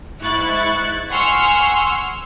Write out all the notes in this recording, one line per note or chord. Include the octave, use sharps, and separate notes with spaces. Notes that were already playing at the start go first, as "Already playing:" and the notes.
G#2 E4 C#6 F#6 A6
F#5 G#5 C6 C#6 E6 F6